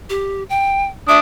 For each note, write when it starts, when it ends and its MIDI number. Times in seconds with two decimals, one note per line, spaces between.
0.10 0.43 67
0.50 0.86 79
1.09 1.19 62
1.09 1.18 76
1.09 1.19 87